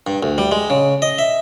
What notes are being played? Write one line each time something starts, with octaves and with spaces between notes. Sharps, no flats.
G2
D2
G3
G#3
C#3
D#5
E5